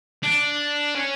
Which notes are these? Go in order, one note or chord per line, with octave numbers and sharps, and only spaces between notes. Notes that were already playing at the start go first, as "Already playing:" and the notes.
D4
C#4